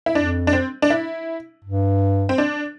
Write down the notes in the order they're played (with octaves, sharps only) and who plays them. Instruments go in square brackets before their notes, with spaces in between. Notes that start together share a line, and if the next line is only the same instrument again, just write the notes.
[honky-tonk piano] E4
[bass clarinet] F2 [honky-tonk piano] D4
[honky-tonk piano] D4
C4
D4
E4
[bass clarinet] G2
[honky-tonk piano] C4
D4